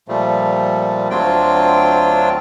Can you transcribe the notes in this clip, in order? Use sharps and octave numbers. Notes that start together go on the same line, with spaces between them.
A#2 F3 G3 A3
D2 F#3 C4 D4 F4 G5